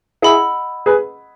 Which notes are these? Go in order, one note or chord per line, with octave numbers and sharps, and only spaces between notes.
E4 G#4 D#5 F#5 B5 E6
G#4 B4